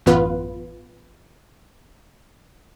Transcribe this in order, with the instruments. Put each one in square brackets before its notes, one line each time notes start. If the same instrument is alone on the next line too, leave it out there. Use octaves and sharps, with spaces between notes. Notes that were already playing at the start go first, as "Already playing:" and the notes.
[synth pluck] A1 F#2 E3 B3 F4 B4